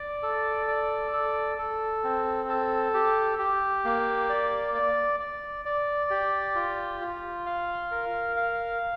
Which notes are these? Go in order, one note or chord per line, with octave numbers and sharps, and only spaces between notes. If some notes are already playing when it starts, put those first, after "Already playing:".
Already playing: D5
A4
D5
A4
A4
C4
A4
G4
G4
A#3
D5
D5
D5
D5
G4
F4
F4
F5
A#4
F5